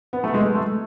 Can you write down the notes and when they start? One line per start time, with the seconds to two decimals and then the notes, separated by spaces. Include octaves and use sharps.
0.13 B3
0.24 A3
0.34 G#3
0.55 A3